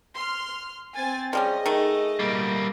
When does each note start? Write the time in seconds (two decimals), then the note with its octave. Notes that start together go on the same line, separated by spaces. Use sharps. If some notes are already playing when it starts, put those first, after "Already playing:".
0.13 C6 F6
0.95 C4 G#5 A6
1.33 F3 G3 C#4 G#4 D#5
1.66 D#3 A3
2.19 G3 A#3